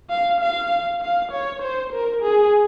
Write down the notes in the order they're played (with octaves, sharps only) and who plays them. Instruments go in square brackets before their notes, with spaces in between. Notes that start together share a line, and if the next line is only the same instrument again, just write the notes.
[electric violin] F5
F5
F5
C#5
C5
A#4
G#4